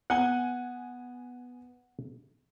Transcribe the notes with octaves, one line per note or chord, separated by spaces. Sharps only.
B3 F#5 G#5 G7